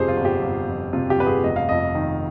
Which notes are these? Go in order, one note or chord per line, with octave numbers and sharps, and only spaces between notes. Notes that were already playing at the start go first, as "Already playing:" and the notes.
Already playing: G1 F2 C3 G4 G#4 C5
F4
G1
G4
G1
F2
C3 F4
G4
G1 B4
G#4
F1 D#5
F5
F2 D#5
D#3